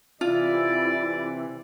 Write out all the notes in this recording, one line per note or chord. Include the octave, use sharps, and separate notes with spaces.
C3 E3 E4 F4 D5